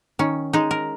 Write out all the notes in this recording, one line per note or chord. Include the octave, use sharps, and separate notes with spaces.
D#3 C#4
G#3 D#4
A#4